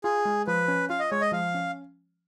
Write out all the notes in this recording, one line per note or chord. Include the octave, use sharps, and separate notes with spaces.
F4 G#4
G#3
F3 B4
C#4
F4 F5
D#5
G#3 C#5
D#5
F3 F5
C#4